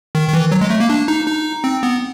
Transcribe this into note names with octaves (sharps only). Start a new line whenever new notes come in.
D#3
D#3
E3
F#3
G#3
A3
A#3
D4
D#4
D#4
C4
B3